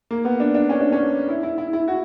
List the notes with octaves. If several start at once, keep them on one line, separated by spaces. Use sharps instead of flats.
A#3
B3
D4
D4
C#4
D4
C#4
E4
E4
E4
E4
F#4